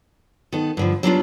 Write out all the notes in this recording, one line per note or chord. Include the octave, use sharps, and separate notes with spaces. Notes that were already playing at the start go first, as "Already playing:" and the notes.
D#3 B3 A4
G2 D3 F3
F#3 G3 B3 D4 D#4 F4